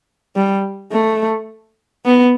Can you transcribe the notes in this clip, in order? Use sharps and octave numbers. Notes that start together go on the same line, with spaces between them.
G3
A3
B3